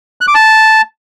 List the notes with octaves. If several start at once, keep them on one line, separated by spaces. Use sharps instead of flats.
F#6
D6
A5